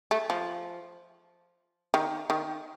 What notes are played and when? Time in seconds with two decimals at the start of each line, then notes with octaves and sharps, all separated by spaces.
0.11 A3
0.30 F3
1.94 D#3
2.30 D#3